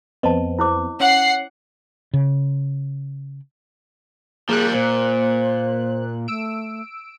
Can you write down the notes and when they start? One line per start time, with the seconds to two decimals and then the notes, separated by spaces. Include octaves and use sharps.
0.23 F2 B3 C4 D#5 A5
0.59 E4 C5 D6
1.00 C#4 F#5 C7
2.13 C#3
4.49 F3 G3 A#3 G#4 F#6
4.73 A#2 C5
6.28 A3 E6 D7